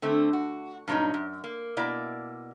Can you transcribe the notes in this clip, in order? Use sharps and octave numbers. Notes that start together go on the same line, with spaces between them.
D3 A3 C4
F#4
G2 A#2 F#3 C#4 D#4
F#2
A#3
B2 A#3 E4 D5